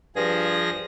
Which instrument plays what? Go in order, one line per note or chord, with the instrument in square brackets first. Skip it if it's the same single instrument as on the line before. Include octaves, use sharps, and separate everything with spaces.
[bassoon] G2 [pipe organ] F3 G#4 A#6